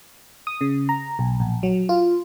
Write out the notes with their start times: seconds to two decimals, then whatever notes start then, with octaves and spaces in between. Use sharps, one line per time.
0.47 D#6
0.61 C#3
0.89 A#5
1.19 B1
1.40 A#1
1.63 F#3
1.89 F4